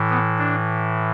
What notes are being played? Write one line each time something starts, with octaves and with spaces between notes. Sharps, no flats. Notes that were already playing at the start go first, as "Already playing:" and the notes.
Already playing: A2 E3
B3
D4